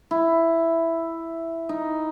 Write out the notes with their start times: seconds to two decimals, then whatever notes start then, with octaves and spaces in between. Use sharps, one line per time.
0.11 E4
1.69 D#4